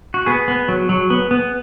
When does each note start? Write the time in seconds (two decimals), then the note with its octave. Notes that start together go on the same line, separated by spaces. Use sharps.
0.14 F#4
0.26 B3 G#4
0.48 B3
0.68 F#3
0.89 F#3
1.10 B3
1.31 B3